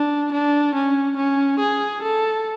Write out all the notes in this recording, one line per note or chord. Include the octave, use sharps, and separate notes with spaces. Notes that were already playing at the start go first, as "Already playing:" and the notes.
Already playing: D4
D4
C#4
C#4
G#4
A4